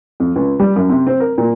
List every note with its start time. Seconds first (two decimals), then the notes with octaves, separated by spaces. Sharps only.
0.20 F2
0.36 C#2
0.60 G3
0.76 F#2
0.90 C3
1.07 C4
1.20 A#4
1.38 A#2